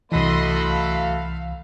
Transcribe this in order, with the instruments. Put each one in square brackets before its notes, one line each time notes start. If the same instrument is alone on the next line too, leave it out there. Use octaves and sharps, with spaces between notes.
[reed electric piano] C2 E3 [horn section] F#3 A3 A4 [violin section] D#5 C6 [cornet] B5
[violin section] F5